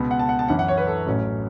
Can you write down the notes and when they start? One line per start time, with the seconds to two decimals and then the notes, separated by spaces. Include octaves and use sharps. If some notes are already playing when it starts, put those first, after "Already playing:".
Already playing: C#2 B2 B3
0.11 F#5
0.19 A5
0.29 F#5
0.39 A5
0.48 F#2 E3 C#4 F#5
0.59 F#5
0.68 C#5
0.78 B4
0.87 A4
1.06 A1 A2 F#3 C#4